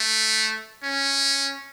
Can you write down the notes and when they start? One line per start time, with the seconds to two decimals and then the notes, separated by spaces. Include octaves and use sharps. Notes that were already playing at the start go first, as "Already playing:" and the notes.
Already playing: A3
0.84 C#4